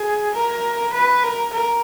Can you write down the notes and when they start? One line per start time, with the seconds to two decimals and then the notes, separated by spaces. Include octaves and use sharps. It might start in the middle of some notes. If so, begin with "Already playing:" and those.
Already playing: G#4
0.35 A#4
0.93 B4
1.23 A#4
1.53 A#4